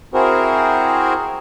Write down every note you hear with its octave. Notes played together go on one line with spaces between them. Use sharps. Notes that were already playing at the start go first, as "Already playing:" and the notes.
C4 E4 F#4 G#4 A#4 C5